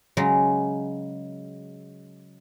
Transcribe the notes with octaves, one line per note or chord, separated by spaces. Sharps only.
C#3 F#3 G#3